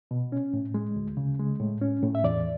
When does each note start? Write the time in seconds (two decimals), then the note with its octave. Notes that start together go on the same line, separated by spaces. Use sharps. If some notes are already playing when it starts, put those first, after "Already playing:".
0.11 B2
0.32 C#4
0.53 A2
0.74 G#3
0.96 D2
1.17 C#3
1.39 G#3
1.60 A2
1.81 C#4
2.03 A2
2.15 E5
2.24 E2 D5